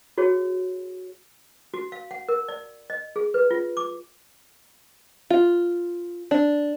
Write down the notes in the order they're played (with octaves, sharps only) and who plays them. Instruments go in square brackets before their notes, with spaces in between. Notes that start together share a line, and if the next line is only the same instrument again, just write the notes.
[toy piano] F#4 G#4 C#5
F#4
F5
F#5
A#4
D5
D#5
G#4
B4
F4
D6
[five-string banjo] F4
D4